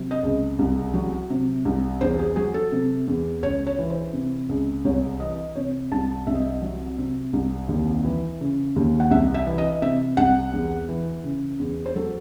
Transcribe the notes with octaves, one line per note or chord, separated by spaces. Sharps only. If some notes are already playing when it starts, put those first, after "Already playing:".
Already playing: C3 F#3
D#5
C#2
C2
F#3
C3
C2
E2 C5
G#4
F#3 G#4
A4
C3
E2
C#2 C#5
C#5
E3
C5
C3
C#2
C2 C#5
E3 D#5
C3 C#5
C2 A5
C2 E5
D#5
E5
F#3
C3
C2
D#2
E3
C#3
D#2
F#5
C2 E5
E5
E3
D#5
C3 E5
C2 F#5
E2
E3
C#3
E2
C5
F#3 A4